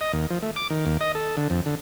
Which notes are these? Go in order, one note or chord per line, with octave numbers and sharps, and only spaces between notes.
D#5
D#2
F3
A3
D6
D#3
D#2
D#5
A4
D3
F2
D3